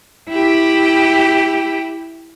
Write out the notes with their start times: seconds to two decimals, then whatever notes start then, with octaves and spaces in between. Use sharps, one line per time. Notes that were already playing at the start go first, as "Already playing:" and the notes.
0.29 E4 G4